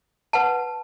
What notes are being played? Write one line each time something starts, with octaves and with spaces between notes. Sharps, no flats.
B4 F#5 A5